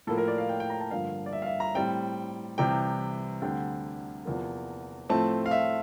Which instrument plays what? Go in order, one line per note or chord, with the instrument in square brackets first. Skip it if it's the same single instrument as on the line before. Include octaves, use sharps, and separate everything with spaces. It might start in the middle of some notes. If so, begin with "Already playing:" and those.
[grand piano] A2 F3 A#3 A4
A#4
D5
F5
G5
G5
A#5
A5
G2 D3 F3 A#3 F5
D5
E5
F5
E5
A#5
A2 G3 C4 G5
C2 C3 E3 G5
D2 D3 G3 C4 G5
E2 C3 F3 A#3
A2 F3 A3 C4 A5
F5
E5